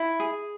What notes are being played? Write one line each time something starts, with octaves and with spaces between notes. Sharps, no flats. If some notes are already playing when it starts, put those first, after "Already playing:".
Already playing: E4
G#4